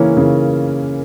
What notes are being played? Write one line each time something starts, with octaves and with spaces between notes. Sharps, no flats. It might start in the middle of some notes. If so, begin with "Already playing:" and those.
Already playing: C#3 E3 A#3 C#4
C#3